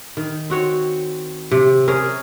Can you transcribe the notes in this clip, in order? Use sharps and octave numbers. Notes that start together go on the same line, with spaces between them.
D#3
C4 F#4 C#5
C3
C#4 G#4 A#4